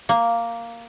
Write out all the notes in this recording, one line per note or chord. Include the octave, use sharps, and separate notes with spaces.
A#3